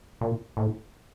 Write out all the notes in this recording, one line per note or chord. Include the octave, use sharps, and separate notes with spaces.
A#2
A2